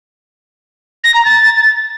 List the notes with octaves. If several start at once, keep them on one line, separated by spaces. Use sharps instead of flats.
A#6
A#5
A6